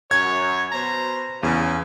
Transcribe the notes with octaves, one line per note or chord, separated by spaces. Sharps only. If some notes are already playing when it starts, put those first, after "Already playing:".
F#2 C#5 G#6
B2 C5 A#5
E2 C#3